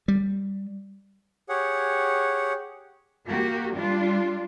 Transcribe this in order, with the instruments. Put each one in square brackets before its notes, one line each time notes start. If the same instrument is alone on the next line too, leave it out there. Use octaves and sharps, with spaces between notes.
[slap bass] G3
[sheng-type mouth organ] G4 G#4 C#5 F#5
[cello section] A#3 F#4 G4
G3 D4 F4